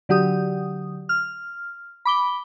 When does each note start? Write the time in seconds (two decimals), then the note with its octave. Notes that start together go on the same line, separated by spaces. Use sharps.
0.09 D3 F#3 G4 D#6
1.09 F6
2.05 B5 D6 G7